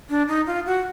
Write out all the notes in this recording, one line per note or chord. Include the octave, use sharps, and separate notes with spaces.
D4
D#4
F4
F#4